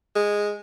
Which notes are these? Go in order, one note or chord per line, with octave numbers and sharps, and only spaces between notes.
G#3